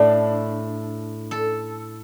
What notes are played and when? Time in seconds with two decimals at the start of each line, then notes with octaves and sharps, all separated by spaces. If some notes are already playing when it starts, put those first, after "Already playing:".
Already playing: A2 A3 D4
1.31 A4